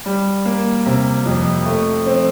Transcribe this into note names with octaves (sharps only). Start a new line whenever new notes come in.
G3
A#3
C3
F2
A3
C4